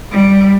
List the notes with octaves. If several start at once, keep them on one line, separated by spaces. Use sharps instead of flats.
G3